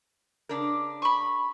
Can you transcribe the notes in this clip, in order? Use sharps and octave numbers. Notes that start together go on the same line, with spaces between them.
C#3 D4 A#4
B5 C#6